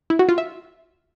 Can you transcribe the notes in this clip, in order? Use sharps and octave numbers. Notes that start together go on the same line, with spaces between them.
E4
F#4
F4
E5